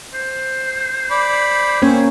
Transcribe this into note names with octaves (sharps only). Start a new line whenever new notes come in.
C5
D5 B5
A#3 C4 C#4 C#5 G#5